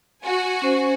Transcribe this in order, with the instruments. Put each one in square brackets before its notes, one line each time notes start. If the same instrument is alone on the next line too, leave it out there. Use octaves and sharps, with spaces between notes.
[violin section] F#4 G#5
[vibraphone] C#4 C5